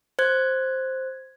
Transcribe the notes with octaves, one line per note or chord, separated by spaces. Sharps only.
C5 F#6 G#6